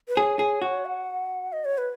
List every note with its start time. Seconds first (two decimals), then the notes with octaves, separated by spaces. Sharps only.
0.08 B4
0.17 G#4 C#5
0.39 G#4
0.62 F#4
0.85 F#5
1.53 D#5
1.65 C#5
1.78 B4